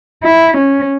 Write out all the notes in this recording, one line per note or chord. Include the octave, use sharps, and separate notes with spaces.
E4
C#4